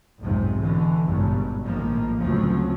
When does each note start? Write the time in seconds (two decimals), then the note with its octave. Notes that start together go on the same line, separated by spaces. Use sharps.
0.19 B1 F2 G#2 C3
0.58 B2 D3 E3
1.05 G#1 C#2 G2 B2
1.67 A#1 A2 D#3 F3 A#3
2.19 D2 A#2 C#3 F3 F#3 C4